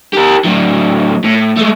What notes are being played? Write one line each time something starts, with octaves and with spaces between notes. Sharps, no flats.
G4 A#4
A2 F#3
A2
G#3 A3